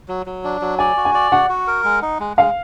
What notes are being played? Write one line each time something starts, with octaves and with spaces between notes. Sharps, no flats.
F#3
F#3
D4
F#3
D5 G#5
F#4
G#5
D5
F#4 F#5
F#4
A#4
G#3
D#4
G#3
G#3 F5